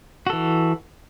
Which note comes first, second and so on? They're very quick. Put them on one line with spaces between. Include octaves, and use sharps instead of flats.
F#4 A4 E3